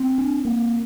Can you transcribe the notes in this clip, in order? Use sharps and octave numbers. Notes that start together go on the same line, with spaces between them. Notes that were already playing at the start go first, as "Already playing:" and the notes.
Already playing: C4
D4
A#3